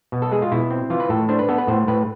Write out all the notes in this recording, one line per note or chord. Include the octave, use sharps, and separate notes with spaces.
B2
A4
G#3 G#4
F4
B2 E4
C4
E3 F4
B4
A2 A4
D4 C5
B4
B3 A4
B4
A2 C5
A2 B4